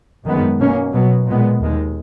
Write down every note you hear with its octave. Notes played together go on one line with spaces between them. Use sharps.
F#2 D#3 G#3 B3
B2 A#3 C#4
B2 F#3 B3
A#2 G#3 B3
D#2 D#3 G#3